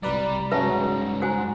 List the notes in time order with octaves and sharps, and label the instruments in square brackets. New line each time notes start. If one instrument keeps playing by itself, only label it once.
[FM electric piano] C2 B4 D5 [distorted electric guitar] G3 [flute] A#5
[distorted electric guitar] G2 G#3 [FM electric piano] C#3 C#4 F#4 [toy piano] B4 E5 A5
[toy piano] F#4 C5 G#5 [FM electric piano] F#5